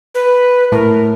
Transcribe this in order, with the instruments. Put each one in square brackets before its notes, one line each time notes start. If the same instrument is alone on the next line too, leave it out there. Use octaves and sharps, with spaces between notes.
[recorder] B4
[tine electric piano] A2 [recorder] A#4